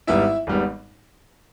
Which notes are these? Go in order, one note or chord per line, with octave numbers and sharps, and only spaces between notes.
G#1 G#2 G3 B3 E4 E5
G#1 G#2 G3 B3